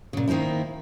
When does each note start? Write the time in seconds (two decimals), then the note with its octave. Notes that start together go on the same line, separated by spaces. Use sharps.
0.13 A#2 C#3
0.28 D#3 A#3 C4 D#4 E4